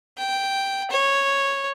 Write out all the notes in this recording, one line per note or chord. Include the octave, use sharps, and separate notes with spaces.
G5
C#5